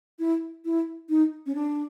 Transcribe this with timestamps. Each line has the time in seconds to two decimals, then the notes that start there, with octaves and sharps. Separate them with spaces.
0.19 E4
0.65 E4
1.09 D#4
1.46 C#4
1.55 D4